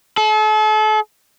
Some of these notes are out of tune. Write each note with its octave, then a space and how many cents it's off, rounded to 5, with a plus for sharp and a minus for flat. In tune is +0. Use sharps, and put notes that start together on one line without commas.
A4 -40